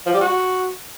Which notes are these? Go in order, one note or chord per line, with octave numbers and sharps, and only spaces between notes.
F3
G3
F#4